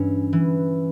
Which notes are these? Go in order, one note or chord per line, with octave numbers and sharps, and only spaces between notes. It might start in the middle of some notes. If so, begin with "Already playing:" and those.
Already playing: G2 E3 C#4
E3